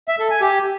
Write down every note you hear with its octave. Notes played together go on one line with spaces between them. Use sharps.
E5
A4
G#5
G4